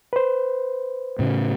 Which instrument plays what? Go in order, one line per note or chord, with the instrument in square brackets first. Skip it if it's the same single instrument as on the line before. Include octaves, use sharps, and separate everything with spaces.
[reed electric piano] B4 C5
[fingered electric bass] A2 C#3 A3